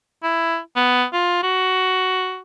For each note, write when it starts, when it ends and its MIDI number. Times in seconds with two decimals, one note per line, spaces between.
0.23 0.58 64
0.76 1.05 59
1.13 1.40 65
1.43 2.40 66